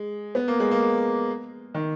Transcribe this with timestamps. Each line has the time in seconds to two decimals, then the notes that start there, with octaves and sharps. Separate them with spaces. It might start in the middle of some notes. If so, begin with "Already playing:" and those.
Already playing: G#3
0.35 B3
0.48 A#3
0.60 G#3
0.71 A#3
1.74 D#3